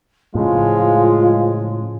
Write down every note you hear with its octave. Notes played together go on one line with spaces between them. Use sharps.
A2 C#3 F3 G#3 F4